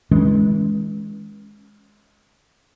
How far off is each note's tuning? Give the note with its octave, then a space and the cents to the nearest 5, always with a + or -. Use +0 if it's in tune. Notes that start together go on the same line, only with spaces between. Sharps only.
E3 -35 G#3 +0 C#4 +0